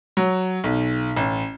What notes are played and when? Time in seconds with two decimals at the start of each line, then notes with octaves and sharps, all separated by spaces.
0.17 F#3
0.64 B1
1.16 A1